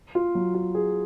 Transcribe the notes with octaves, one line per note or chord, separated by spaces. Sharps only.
F4
F#3
F4
G#4